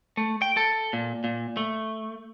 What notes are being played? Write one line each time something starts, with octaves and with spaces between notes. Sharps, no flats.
A3
G5
A4
A#2
A#2
A3